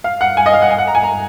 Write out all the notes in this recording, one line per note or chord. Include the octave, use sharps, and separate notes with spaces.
F5
F#5
G#5
D#5
F5
F#5
G#5
F#5
A#5
G#5
A#5